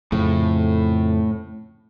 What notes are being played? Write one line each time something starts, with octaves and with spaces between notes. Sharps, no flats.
F2 A2 C#3